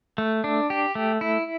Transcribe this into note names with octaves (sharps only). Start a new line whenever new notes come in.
A3
D4
G4
A3
E4